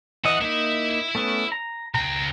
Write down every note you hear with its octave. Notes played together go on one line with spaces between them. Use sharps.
E3 E4 D#5 F#5
A#3 D#4 E4 E5
A3 B3 C#4
A#5
C#2 G5 A#5